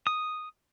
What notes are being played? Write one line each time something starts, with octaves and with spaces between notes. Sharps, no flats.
D#6